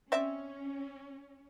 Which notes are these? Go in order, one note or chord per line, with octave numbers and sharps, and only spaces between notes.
C4 C#4 D5 E5